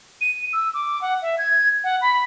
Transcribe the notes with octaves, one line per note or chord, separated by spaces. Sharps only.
D#7
E6
D6
F#5
E5
G#6
F#5
B5